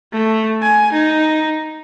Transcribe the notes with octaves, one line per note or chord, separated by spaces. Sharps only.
A3
G#5
D#4